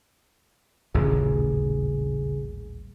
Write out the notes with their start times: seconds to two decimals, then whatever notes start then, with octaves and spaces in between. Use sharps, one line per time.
0.95 D#1 A1 D2 C#3 G#4